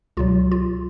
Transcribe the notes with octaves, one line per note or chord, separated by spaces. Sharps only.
C#2 B2 F#3 F4
F4